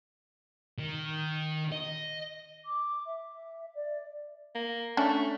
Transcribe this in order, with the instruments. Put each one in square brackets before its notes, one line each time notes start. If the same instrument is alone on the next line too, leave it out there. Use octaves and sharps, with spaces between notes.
[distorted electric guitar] D#3
D#5
[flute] D6
E5
D5
[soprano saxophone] A#3
[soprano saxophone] A3 [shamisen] C#4 D4